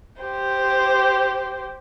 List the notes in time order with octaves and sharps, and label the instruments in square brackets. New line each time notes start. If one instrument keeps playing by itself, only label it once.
[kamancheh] G4 C5